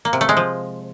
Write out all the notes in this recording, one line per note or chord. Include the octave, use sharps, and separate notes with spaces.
A#3
C3
A3
G#3
F3